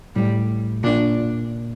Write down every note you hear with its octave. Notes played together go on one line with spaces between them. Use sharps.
A2 G3
A#2 D4